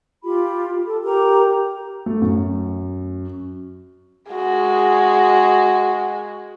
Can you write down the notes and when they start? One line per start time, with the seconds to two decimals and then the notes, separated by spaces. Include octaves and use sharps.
0.23 F4 G4 B5
0.86 A4
1.04 G4 A#4 A#5
2.06 A3
2.22 F#2
4.32 G#3 F#4